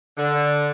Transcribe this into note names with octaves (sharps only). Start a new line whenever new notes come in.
D3